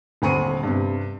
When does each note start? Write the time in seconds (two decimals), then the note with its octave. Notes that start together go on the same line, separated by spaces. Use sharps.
0.22 D#1 D2 C4 B5 C#6 D#7
0.63 G2 C3